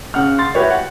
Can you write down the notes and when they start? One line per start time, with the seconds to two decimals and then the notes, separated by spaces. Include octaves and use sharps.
0.14 C#3 F#5 F6
0.38 C6 A6
0.55 E4 F#4 G4 B4 C#5
0.70 F#5